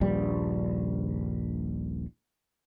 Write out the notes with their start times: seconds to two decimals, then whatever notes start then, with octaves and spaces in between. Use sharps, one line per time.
0.01 D#1 A#1 G2 G3